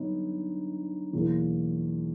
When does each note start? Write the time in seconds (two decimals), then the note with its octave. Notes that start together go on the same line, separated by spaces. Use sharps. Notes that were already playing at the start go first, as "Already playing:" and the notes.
Already playing: G2 D3 F#3 B3 D#4
1.13 E2 B2 F#3 A#3